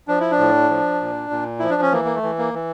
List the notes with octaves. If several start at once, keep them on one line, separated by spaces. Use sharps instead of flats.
F3 D4
E4
D4
A2
F3
A#2
A#2
F3 E4
D4
C#4
E3 A#3
A#3
A3
E3
A#3
E3